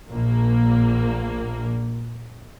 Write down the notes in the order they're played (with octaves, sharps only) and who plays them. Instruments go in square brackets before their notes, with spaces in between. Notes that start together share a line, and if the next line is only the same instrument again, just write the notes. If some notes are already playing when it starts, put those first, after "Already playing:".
[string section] A#1 A#3